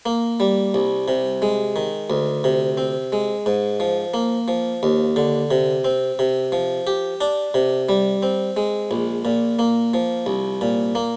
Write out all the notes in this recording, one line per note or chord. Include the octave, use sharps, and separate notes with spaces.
A#3
G3
C2
C3
G#3
D#3
D2
C3
C4
G#3
G#2
F3
A#3
F3
D#2
D3
C3
C4
C3
F3
G4
D4
C3
G3
C4
G#3
A#1
A#2
A#3
F3
C2
A#2
A#3